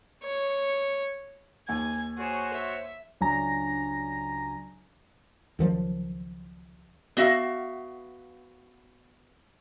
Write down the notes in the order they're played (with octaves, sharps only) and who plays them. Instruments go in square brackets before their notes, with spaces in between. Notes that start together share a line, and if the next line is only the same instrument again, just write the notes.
[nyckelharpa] C#5
[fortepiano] D#2 [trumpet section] G#5 [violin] G#6
[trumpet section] F#4 C5 C#5 [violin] G#4 E7
[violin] E5
[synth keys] C#2 F#3 D4 G#5 A#5 A#6
[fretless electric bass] C#2 D#3 F3 F#3
[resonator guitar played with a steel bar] B3 F#4 E5 F5